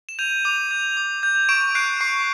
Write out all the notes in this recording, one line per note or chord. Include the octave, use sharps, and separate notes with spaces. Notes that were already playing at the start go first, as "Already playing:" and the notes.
E7
G6 D#7 F7
D6 D#7 F7
G6
D6
G6
C#6 D7 E7
F#6 C7 D7
C#6 C7